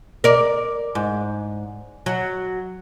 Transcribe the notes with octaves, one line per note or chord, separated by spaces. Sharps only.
A#4 D5
G#2
F#3